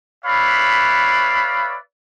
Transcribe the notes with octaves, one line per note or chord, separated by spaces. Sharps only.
B4 C#5 D5 E5 F5 B5